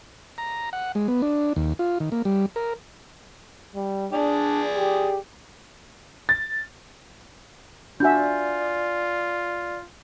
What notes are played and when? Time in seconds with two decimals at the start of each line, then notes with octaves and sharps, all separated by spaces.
0.38 A#5
0.73 F#5
0.95 G#3
1.08 B3
1.22 D4
1.56 D#2
1.79 F4
2.00 D#3
2.12 A#3
2.25 G3
2.56 A#4
3.75 G3
4.13 D4 G#4 D5
4.76 G4
6.29 A6
8.00 D4 F4 F#4 D5 E5 G#5 G6